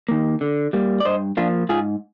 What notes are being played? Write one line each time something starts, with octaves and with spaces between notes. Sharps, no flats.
D#3 A#3
D3
G3 A#3
D5
G2 C5 D#5
F3 A#3 D4 F4
G#2 F4 G#4